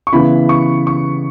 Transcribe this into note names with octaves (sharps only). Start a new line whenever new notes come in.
C#6
C#3 E3 B3 E4 B5
C#6
C#6